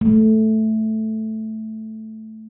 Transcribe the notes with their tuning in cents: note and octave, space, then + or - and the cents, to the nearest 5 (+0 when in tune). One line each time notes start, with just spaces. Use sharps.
A3 -5